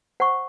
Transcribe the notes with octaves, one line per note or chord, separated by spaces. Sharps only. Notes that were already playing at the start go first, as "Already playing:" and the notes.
C5 F#5 C#6